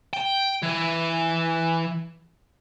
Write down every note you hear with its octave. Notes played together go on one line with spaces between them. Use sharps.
G5
E3